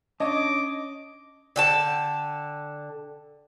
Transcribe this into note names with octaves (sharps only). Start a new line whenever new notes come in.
C#4 D4 C#5 D#5 A5 D6
D3 G5 A5